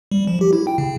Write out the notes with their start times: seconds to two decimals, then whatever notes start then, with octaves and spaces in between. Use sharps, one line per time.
0.11 G3
0.27 F3
0.41 G4
0.53 E4
0.67 G5
0.78 C#3